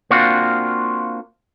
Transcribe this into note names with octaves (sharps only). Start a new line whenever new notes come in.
A#3 C4 D4 F4 F#4